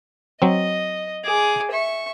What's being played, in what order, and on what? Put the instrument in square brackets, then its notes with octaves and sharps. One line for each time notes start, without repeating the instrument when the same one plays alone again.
[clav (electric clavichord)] F#3 C4 [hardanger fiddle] D#5
[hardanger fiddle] G#4 D6
E5 C#6